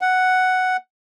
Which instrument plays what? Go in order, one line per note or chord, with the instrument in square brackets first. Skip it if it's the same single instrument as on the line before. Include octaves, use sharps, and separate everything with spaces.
[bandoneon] F#5